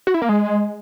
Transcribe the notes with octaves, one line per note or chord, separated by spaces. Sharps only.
F#4
E4
A#3
G#3